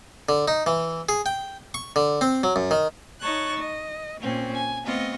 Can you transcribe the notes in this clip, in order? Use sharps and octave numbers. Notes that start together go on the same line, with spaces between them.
D3
D#4
E3
G#4
G5
C#6
D3
C4
F#3
F#2
D#3
D#4 C#5 A5 C#6 F#6
D#5
A#2 C4 C#4
G#5
A3 B3 C4 F4 D#5 C#6